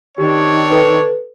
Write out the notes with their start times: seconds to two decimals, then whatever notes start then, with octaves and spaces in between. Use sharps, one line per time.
0.18 D#3 C4 D4 G4 C#5
0.71 A4 B4